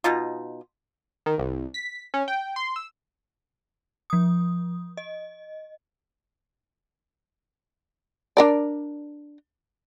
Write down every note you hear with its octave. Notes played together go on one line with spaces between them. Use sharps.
B2 D#4 F4
D#3
C2
B6
C#4
G5
C6
E6
F3 D#6
D#5
D4 A#4 D5